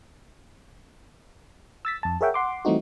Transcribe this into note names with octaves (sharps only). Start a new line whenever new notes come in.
E6 A6 B6
F2 A5
G#4 A#4 C#5 E5 F#5 G5
F#5 C6 D6
E3 G3 A3 C4 D#4 F#4